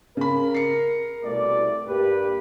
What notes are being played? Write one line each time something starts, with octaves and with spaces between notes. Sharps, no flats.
C#3 A#4 B5
C7 C#7
C2 B2 A3 D5
G2 A#3 G4 B4